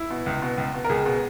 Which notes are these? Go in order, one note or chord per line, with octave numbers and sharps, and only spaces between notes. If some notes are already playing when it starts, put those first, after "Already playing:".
Already playing: E4
B2
C#2
B2
C#2
B2
A#4
C#2 G#4
B2